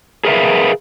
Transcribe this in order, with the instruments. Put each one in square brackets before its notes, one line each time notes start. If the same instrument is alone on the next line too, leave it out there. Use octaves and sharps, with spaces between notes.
[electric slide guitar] G#4 A#4 B4 E5 F5